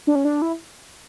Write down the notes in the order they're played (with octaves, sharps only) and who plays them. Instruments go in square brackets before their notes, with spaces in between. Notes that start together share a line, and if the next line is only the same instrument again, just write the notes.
[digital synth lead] D4
C#4
D4
E4